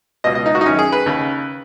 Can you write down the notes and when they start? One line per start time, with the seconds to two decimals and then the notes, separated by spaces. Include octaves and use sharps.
0.24 C#2 B2 D#5
0.35 D#5
0.46 D#4
0.55 F#4
0.61 D#4
0.65 F#2 D#3 C#4
0.79 G#4
0.92 B4
1.06 D#2 C#3